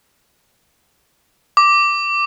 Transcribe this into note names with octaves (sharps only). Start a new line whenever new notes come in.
D6